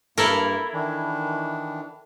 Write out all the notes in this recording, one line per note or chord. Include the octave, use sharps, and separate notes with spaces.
G2 A#3 E4 A4 A#4
D#3 E3 D4